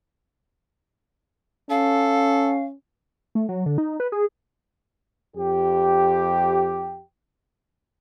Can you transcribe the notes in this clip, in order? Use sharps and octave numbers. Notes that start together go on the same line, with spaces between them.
C#4 A4 F5
A3
F#3
D3
D#4
B4
G#4
F2 G4